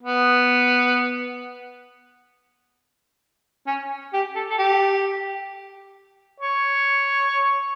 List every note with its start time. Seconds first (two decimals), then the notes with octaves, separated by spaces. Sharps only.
0.03 B3
3.67 C#4
4.13 G4
4.35 A4
4.50 A4
4.58 G4
6.40 C#5